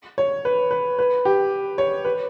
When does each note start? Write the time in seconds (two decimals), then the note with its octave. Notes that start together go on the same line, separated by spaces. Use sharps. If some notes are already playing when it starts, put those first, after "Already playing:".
0.18 C#5
0.45 B4
0.71 B4
0.99 B4
1.25 G4
1.78 C#5
2.05 B4